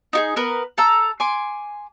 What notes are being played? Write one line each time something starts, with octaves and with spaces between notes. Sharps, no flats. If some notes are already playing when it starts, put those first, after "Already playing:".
D#4 F#4 G#4
B3 A#4 B4
A4 A#5 E6
G#5 C6 D6